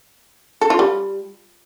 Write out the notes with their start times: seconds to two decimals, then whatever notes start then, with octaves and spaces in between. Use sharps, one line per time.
0.61 A4
0.70 F4
0.79 G3